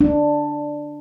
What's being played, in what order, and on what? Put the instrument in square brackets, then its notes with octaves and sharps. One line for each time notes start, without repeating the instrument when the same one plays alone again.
[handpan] D4